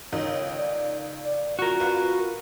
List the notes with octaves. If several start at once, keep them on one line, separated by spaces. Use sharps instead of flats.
C#2 D#3 C#5 D#5
D5
D5
F4 F#4 A#4
B4 F5